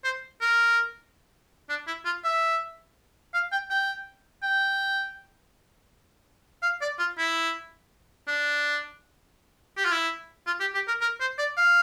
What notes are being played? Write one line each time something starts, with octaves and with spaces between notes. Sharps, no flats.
C5
A#4
D4
E4
F4
E5
F5
G5
G5
G5
F5
D5
F4
E4
D4
G4
F4
E4
F4
G4
G4
A#4
A#4
C5
D5
F5